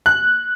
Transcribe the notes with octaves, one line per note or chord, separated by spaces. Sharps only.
F#6